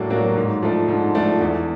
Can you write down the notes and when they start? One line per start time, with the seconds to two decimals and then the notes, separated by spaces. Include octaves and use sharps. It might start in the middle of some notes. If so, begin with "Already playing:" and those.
Already playing: A2 F#3 A#3 D4 F#4
0.10 F#3 A#3 D4 F#4
0.37 G#2
0.62 F3 A3 D4
0.88 G#2
1.15 F3 A3 D4
1.41 E2